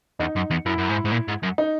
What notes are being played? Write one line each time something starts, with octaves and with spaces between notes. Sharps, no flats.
E2 D#4
F#2
E2
F#2 E4
F#2
G#2
G#2
A#2
G#2
F#2
D#4